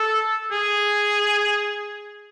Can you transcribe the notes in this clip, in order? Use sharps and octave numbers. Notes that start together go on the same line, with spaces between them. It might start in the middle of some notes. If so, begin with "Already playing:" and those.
Already playing: A4
G#4